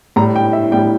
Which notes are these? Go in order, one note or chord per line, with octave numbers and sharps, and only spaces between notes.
A2 G3 A#5
G5
E5
A2 G3 G5